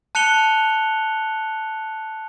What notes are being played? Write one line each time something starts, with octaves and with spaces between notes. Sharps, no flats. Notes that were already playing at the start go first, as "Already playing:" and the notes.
A5 F#6 C#7 F7 G7